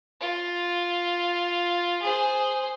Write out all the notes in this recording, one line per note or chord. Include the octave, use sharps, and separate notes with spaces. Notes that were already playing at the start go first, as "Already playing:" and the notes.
F4
G#4 C5